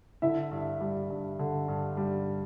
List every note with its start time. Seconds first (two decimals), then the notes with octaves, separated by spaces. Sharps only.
0.22 D3 E4 E5
0.52 G2
0.81 G3
1.10 G2
1.39 D3
1.68 G2
1.97 G3